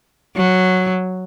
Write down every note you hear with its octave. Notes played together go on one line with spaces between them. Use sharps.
F#3